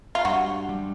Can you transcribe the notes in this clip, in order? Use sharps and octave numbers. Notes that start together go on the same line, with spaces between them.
F4
G2 F#4
G3